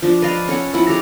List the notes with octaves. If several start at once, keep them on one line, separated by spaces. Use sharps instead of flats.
F3 D4
B4 D5 D#5 F5
C#4 A4 C#5 F#5
F3 E4 F#5 B5
G#3 G4 A4 A#5